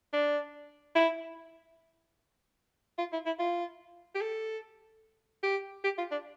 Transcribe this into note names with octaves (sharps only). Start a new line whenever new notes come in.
D4
E4
F4
E4
E4
F4
G4
A4
G4
G4
F4
D4